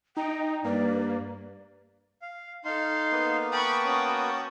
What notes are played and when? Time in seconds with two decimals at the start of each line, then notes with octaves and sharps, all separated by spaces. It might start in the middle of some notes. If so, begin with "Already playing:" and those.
0.17 D#4 G5 A#5
0.65 G2 A#3 B4 D5
2.22 F5
2.65 D#4 A4 F5 C6
3.12 A#3 B3 B4
3.52 G5 A5 B5 C#6 D#6
3.84 C#4 F#4